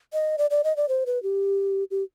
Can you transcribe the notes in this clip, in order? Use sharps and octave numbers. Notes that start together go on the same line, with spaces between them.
D#5
D5
D5
D#5
D5
C5
B4
G4
G4